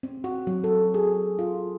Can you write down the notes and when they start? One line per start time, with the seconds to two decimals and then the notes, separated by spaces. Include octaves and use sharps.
0.03 C4
0.24 F#4
0.47 F#3
0.64 A4
0.94 G#4
1.39 F4